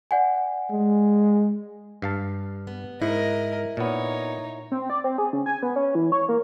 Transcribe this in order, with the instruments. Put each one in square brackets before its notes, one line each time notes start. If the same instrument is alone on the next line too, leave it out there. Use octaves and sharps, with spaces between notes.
[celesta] D5 F#5 G#5
[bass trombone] G#3
[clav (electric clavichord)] G2 F5 A5
[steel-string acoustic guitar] B3
[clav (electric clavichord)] G#2 [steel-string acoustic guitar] E4 [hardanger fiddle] A#4 D#5
[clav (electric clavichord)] A#2 B3 [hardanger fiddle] D#4 C#5
[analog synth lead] C4
D5
C4
G#4
C#3
G#5
B3
C#4
E3
C#5
A#3